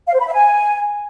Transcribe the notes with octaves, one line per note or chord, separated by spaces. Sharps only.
F5
C5
B5
E5
G#5